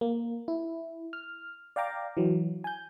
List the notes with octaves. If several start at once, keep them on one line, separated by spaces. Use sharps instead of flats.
A#3
E4
F6
D5 F5 G5 A#5 D6
E3 F#3
G#5 G6